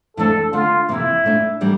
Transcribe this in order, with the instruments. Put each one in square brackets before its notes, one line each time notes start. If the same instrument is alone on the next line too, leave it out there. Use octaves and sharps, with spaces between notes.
[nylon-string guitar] F2 E3 A3 D4 [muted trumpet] A4
[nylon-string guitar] D3 A3 D4 [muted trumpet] F4
[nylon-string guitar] F2 C3 E3 A#3 [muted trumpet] E4
[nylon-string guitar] A#2 A3 D4
A2 E3 G3 A#3 D4